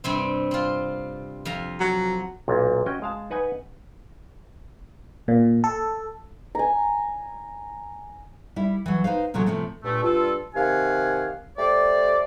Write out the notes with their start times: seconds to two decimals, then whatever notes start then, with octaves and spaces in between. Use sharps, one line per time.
0.04 G2 C3 C4
0.51 C4 F4
1.45 F2 F4 A#5
1.80 F#3
2.48 B1 A#2
2.86 C#4 F#4 D#5 G5
3.02 G#3 F5 A5
3.31 D#4 B4 F#5 G#5
5.28 A#2
5.64 A4
6.55 G#5 A#5
8.56 G3 E4
8.86 E3 F#3
9.04 D#4 E4 B4 C5 F5
9.34 A#2 C#3 F3 F#3 A3
9.46 A2 C3 F3 A3
9.83 G2 A#2 A3
10.03 G2 F4 A4
10.55 C3 D#3 G4 F5 F#5 G#5
11.58 A3 G4 C5 D5